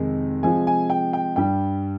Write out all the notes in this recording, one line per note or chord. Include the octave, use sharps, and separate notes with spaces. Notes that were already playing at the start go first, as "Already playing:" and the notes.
Already playing: F2 C3 D#3 G#3
C3 F3 G#3 G#5
G#5
G5
G5
G2 G3 G5